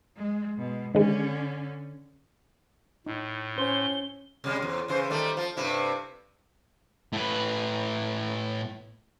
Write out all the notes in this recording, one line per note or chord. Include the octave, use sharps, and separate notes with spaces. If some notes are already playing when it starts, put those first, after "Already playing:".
G#3
B2 G#3
D3 D#3 G#3 C#4
A2 D#4
C#4 C5 G7
C3 G3 G#3
E2
C#3 E3 C5
D#3 G3 A3
F3
G2 C3 E4
A2 B4